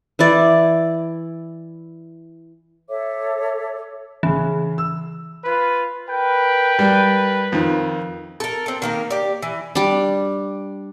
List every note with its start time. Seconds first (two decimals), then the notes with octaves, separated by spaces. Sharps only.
0.19 E3 E4 D5
2.88 A4 C#5 E5 D6
4.23 C#3 E3 C#4
4.78 E6
5.44 F4 B4
6.09 A#4 B4 G5
6.79 G3
7.52 F2 D#3
8.40 A4 A#4
8.66 C4 A4
8.82 D#3 A#3 A#4
9.10 G4 D5
9.42 E3
9.75 G3 D4